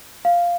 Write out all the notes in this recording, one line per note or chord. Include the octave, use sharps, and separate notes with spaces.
F5